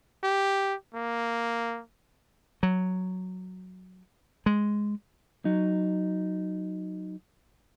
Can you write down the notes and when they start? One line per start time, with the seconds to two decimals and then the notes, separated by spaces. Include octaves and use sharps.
0.23 G4
0.94 A#3
2.63 F#3
4.46 G#3
5.45 F#3 D#4